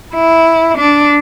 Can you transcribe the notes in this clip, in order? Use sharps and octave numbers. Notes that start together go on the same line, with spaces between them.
E4
D4